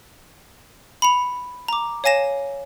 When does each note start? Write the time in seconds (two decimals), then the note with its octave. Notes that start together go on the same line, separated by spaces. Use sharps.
1.02 B5 C#7 F7
1.68 A#5 D6
2.04 C#5 F5 G#5 A#6 E7